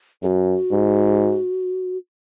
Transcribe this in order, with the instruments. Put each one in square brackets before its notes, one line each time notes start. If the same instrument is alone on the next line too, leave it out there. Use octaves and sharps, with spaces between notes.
[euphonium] F#2 [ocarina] G#4
[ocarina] F#4
[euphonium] G#2